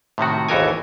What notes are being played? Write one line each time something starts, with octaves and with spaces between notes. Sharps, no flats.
A2 C3 D#3 F#4
G#1 D#2 E3 A4 A#4 G#5